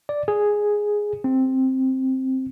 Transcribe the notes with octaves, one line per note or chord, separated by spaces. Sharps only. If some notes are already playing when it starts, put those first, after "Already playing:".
D5
G#4
C4